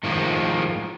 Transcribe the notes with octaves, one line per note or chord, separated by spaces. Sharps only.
A2 D#3 F3 G#3 A#3